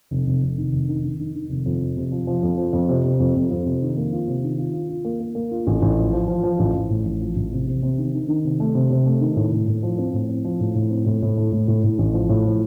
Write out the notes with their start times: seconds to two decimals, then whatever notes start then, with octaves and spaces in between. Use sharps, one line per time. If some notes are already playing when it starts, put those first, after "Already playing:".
0.11 F1
0.26 F1
0.42 F1
0.58 D#3
0.73 F1
0.88 D#3
1.04 D#3
1.19 D#3
1.35 D#3
1.50 F1
1.66 F2
1.81 F1
1.97 C3
2.12 F3
2.27 F3
2.43 F2
2.58 F3
2.73 F2
2.89 C3
3.04 C3
3.19 F2
3.35 F2
3.51 F2
3.66 C3
3.82 D#3
3.97 A#3
4.12 F4
4.28 C3
4.43 D#3
4.58 F4
4.73 F4
4.89 F4
5.05 A#3
5.20 A#3
5.35 A#3
5.51 F4
5.67 A1
5.82 A1
5.98 F3
6.13 F3
6.28 F3
6.43 F3
6.59 A1
6.74 A1
6.90 A2
7.05 A1
7.21 F3
7.36 A1
7.52 C3
7.67 C3
7.82 C3
7.98 D#3
8.14 D#3
8.28 D#3
8.44 C3
8.60 A3
8.75 C3
8.90 C3
9.06 A3
9.21 D#3
9.36 A2
9.52 A2
9.67 A2
9.83 F3
9.98 C4
10.14 A2
10.29 C4
10.44 F3
10.60 A2
10.75 A2
10.91 C4
11.06 A2
11.22 A2
11.38 A3
11.52 A2
11.68 A2
11.84 A2
11.98 A1
12.14 F3
12.29 A2
12.45 F3